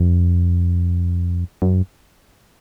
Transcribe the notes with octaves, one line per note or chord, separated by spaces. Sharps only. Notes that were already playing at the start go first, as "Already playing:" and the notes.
Already playing: F2
F#2